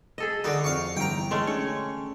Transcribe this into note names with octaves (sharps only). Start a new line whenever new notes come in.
G#4 A4 D#5
D3 D#4 F#4
F2 F5 C#6
G1 E2 G5 A#5 D7
G#3 A3 C#4
C#4 D4 C#5 G#5